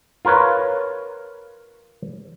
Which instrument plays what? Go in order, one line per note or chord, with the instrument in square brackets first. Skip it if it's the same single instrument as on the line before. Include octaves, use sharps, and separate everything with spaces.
[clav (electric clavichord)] F4 A#4 B4 C#5